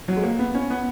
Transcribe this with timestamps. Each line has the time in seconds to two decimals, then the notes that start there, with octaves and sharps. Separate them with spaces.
0.08 F#3
0.17 G#3
0.23 A#3
0.39 B3
0.55 C#4
0.70 B3